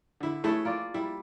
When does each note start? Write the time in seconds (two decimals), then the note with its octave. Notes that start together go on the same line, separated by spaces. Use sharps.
0.20 D3 E4
0.44 E3 A3 E4 G#4 C#5 A5
0.65 A#3 F4 D5
0.94 G3 E4